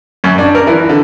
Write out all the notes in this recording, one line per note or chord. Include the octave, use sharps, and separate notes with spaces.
F#2
D4
A#4
E3
D3